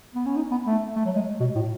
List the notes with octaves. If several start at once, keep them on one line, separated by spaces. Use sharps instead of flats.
B3
C#4
D#4
B3
A3
A3
F#3
G#3
B2
A2